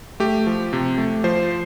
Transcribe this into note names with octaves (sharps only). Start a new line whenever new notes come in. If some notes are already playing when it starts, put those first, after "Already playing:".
A3 G4
F3
C3
A3
F3 C5